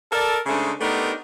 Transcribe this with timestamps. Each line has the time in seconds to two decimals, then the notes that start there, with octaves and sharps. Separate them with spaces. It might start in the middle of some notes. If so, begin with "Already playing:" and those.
0.12 A4 A#4 D5
0.46 C#3 G#3 A3 D4 D#4 C5
0.80 A3 B3 D4 D#4 G4 A#4